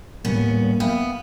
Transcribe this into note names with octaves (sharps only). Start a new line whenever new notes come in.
D#1 A1 G3 A#3 B3 C#4
B3 E5 F5 G5